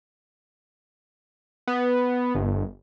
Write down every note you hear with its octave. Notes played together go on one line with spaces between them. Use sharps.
B3
G1